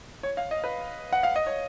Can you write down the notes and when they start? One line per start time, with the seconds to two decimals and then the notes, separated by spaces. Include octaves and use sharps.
0.23 C#5
0.37 F5
0.51 D#5
0.64 B4
1.13 F#5
1.23 F5
1.36 D#5
1.47 C#5